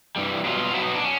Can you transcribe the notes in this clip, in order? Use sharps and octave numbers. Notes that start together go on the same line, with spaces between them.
G2 E3 G3
B2 F#3 F4
B2 F#3 E4
D#4
D4
C#4